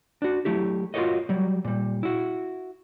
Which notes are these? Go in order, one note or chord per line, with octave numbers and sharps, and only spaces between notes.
D4 F#4
F#3 A3 E4 G4
F4 F#4 G#4 A#4 C#5 D#5
F#3 G3
A#2 G3
E4 F#4